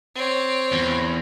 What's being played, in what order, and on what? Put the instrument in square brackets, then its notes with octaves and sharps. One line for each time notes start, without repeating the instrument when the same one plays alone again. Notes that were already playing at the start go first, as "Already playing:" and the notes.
[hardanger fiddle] C4 C#5
[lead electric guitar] E2